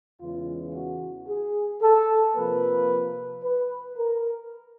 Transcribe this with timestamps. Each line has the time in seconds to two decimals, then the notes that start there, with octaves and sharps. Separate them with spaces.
0.20 E2 C#3 E3 G#3 F4
0.74 F#4
1.27 G#4
1.82 A4
2.35 C3 F3 A#3 B4
3.43 B4
3.97 A#4